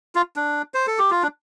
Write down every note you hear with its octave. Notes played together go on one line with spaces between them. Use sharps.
F4
D4
C5
A4
G4
F4
D4